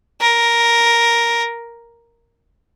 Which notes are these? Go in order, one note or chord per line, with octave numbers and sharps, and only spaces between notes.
A#4